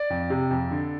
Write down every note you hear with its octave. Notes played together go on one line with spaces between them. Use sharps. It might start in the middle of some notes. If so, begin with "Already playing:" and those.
Already playing: D5
F2
C3
F2
D3